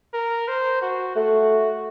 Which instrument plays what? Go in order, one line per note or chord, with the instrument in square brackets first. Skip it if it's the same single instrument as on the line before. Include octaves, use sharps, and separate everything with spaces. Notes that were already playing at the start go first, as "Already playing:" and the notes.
[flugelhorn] A#4
C5
F#4
[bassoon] A3 [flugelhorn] F#4